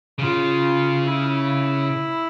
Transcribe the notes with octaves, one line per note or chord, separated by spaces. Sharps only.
C#3 F4
E4